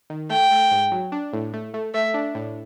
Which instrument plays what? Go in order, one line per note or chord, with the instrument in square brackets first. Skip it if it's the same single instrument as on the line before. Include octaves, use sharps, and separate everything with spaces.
[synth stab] D#3
[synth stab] A3 [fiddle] G5
[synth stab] A3
G#2
F#3
D4
A2
A3
A3
[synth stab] A3 [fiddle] E5
[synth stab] D4
A2